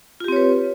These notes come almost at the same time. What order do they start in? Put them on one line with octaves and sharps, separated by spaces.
F4 G4 C4 C#5 B4